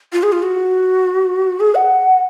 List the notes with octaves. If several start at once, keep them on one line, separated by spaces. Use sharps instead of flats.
F4
G#4
F4
F#4
G#4
F#5